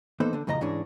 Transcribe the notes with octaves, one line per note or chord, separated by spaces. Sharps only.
E3 A#3 B3 D#4 A4 C5
D3 D4
F2 A2 C#3 D#5 A#5
G#2 E3 C#4 D4 G#4